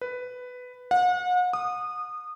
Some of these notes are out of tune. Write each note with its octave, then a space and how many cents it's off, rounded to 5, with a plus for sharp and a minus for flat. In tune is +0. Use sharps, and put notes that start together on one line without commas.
B4 +10
F#5 -40
D#6 -20